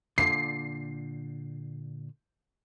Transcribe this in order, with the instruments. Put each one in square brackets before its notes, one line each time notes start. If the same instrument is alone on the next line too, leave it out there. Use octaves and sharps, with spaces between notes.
[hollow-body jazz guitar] A#2 D3 [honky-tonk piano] C7